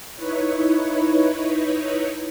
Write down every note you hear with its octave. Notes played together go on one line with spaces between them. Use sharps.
D#4 E4 B4 C#5